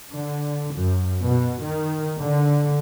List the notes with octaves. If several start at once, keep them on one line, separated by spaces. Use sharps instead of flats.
D3
F#2
B2
D#3
D3